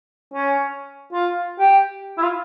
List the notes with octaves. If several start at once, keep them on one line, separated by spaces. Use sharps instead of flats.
C#4
F4
G4
E4
F4